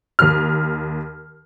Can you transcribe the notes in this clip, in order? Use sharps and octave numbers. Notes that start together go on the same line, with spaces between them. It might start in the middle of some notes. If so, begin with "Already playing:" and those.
D#2 F6